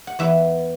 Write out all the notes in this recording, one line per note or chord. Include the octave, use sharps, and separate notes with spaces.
F#5
E2 E3 B4 E5